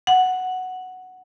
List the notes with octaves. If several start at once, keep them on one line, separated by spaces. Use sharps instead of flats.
F#5